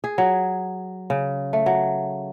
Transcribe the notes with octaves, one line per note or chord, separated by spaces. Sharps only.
G#4
F#3
C#3
A3
F#3